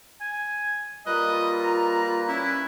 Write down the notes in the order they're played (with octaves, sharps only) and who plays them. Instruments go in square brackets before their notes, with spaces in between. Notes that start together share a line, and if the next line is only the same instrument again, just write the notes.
[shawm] G#5
[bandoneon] G3 B4 F#6 [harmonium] A#3 [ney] F4 [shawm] D#5
[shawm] A#5
[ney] C#4 [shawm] E4